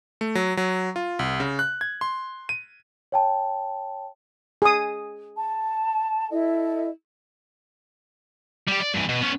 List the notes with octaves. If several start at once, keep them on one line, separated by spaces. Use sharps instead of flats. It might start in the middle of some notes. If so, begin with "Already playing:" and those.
A3
F#3
F#3
F4
C2
C#3
F#6
G#6
C6
D#7
C#5 G5 A5
G#4 D#6
A5
E4 A4 D#5
G3 G4
D5
G2 E3
B2
B3 C#4